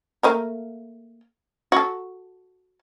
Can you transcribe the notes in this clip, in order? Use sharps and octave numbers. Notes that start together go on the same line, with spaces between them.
A3 A#3 A#4
F#4 A4